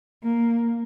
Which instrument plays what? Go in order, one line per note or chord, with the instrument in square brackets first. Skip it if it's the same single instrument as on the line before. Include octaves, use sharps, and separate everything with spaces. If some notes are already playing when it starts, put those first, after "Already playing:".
[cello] A#3